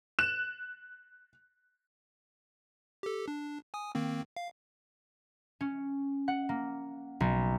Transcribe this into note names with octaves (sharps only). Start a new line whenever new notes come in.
F#6 E7
G4 A4
D4
G#5 D#6
D#3 A#3 C4
F5
C#4
F#5
A#3
B1